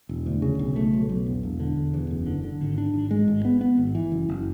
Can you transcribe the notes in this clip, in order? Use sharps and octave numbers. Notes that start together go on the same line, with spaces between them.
E1
D2
C#3
B1
A3
B1
B1
E1
E1
D3
E1
E2
F#1
D3
D3
G#1
D4
G#1
G#3
G#1
B3
B3
G#1
E3
F#1
F#1